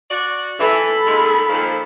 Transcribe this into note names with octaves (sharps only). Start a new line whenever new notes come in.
F#4 D5
E3 A4 B5
A#2 D#3 G#3
A#2 D#3 F3